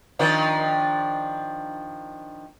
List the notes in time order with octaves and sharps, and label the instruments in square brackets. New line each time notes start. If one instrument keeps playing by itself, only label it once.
[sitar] D#3 F3 D4